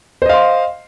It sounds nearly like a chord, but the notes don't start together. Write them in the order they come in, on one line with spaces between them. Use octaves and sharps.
C5 D#5 F5 C6